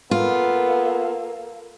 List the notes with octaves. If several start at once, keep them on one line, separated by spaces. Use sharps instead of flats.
A#3 B3 F4 A4